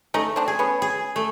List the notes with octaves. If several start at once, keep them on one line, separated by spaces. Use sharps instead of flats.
A3 C#4 D#4
C4 D4
G#4
B3 C#4
G#4
A3